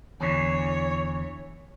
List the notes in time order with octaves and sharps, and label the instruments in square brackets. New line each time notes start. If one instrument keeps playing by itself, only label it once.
[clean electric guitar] E2 D3 E3 [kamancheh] C#5